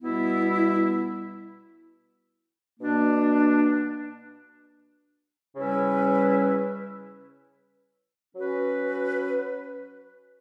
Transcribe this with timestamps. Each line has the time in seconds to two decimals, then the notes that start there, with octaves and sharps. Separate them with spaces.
0.01 B2 G3 B3 E4
2.79 B2 A#3 D4
5.56 C#3 G3 C#4 E4 B4
8.35 F#3 C#4 F#4 B4